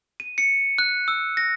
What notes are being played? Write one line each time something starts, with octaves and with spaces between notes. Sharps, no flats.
D#7
C#7
F#6
E6
A#6